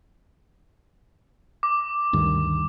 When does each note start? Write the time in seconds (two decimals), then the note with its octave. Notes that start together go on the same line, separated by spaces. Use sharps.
1.63 D6
2.13 D2 G2 D#3